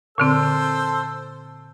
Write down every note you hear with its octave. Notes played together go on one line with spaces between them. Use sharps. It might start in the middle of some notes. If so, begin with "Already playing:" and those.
A#2 D3 C4 A4 C5 E6